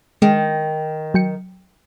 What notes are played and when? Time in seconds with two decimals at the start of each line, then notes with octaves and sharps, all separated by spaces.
0.22 D#3 G#3
1.14 F#3 G5 C#7